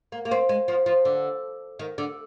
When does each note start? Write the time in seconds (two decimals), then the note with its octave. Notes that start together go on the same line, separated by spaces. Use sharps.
0.12 A#3
0.25 A#3
0.31 C4
0.49 G#3
0.68 F3
0.86 F3
1.05 D3
1.79 D#3
1.98 D3